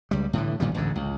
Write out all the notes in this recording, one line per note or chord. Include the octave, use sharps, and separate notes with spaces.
C#2 G3
A2 D3 E3
G1 A#2 D#3 G3
A1 D2 G#2 D3
C#2